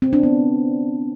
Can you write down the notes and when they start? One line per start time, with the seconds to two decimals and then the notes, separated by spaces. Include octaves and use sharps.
0.02 C4
0.13 D4
0.23 B3